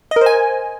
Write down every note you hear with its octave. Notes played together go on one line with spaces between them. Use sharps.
D#5
A#4
C5
G#5